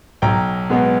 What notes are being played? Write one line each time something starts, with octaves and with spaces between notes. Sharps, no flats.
B1 G5 A#5
B2 G#3 B3